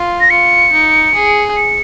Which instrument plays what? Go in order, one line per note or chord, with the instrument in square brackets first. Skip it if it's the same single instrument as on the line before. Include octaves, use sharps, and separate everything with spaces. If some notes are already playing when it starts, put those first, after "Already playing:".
Already playing: [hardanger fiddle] F4
[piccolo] A#6
[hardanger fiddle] F4 [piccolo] C#7
[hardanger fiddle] D#4
G#4
[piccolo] C#7